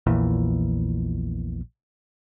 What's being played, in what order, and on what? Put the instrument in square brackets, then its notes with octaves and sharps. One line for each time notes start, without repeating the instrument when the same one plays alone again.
[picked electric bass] A#1 E2 A#2 E3